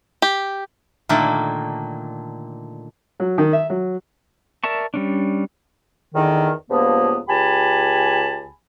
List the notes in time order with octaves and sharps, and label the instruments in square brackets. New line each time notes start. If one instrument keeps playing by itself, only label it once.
[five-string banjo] G4
[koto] A#2 D3 D#3 A3 A#3
[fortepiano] F#3
D#3
E5
F#3
[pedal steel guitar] A#4 D5 E5 A5 C#6
G3 C#4 D4
[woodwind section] E2 D3 D#3
C#2 G2 F3 A#3 B3
C#2 G4 G#5 A5 B5